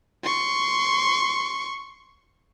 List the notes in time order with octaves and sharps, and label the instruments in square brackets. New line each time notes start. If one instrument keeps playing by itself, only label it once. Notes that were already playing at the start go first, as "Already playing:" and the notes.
[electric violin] C6 C#6